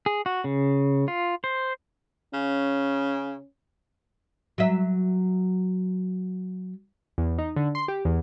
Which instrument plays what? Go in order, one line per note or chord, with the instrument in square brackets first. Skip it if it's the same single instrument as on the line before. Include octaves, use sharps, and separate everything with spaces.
[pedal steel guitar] G#4
F#4
C#3
F4
C5
[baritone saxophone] C#3 [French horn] C#4
[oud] F#3 E5
[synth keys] E2
D#4
D3
C6
G4
E2